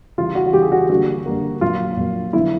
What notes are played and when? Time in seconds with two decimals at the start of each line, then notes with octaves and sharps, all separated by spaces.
0.18 C#3 E3 G3 F4
0.35 F#4
0.46 F#4
0.53 C#3 E3 G3 G4
0.62 G#4
0.72 F#4
0.80 G4
0.89 D3 G3 A#3 F#4
1.26 D3 G3 A#3
1.61 A#2 F#3 A#3 F4
1.97 A#2 F#3 A#3
2.33 D3 F#3 B3 E4